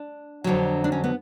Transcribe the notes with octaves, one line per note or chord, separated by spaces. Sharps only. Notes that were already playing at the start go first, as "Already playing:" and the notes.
Already playing: D4
F2 D3 F#3
D4
C#4
B3